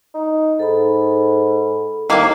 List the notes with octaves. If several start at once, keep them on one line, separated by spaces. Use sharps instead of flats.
D#4
G#2 A4 B5
D#2 D#3 A#3 E4 F5 D6